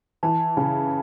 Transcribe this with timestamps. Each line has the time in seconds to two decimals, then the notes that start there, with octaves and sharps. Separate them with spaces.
0.23 E3 A5
0.57 C#3